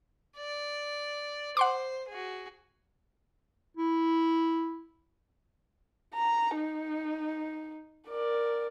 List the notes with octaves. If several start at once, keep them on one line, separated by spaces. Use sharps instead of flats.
D5
C5 F#5 C6 D6
F#4 G#4
E4
A#5
D#4
A#4 D5